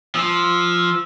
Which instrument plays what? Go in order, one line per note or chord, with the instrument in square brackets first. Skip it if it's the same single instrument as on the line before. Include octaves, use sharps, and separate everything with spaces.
[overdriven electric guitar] F3 [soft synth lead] E6